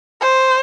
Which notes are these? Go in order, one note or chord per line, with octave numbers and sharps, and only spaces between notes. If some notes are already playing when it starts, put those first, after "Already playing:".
C5